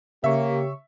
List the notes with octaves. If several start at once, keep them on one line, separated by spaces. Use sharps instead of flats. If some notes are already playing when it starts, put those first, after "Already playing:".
C#3 A#3 G4 C#5 E5 C#6